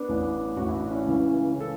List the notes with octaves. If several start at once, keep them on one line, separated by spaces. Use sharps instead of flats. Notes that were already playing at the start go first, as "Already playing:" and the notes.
Already playing: B3 D4
A1 A2 E3
A1 A2 E3 F#4
E4
D4
C#4 E4
C#2 C#3 E3
C#3 E3
A4